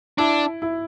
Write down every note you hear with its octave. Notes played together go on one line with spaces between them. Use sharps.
D4 E4
E4